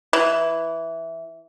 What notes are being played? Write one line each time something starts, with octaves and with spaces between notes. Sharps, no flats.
E3